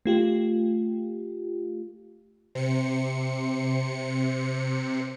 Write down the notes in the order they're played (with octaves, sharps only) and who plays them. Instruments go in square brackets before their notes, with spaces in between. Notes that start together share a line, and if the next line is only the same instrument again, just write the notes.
[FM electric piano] A3 F4 G4
[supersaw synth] C3 C#7 [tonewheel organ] C5